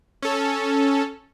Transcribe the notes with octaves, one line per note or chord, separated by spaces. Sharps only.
C#4 A4